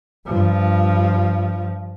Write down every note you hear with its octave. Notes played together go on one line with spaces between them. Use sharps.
G2 F3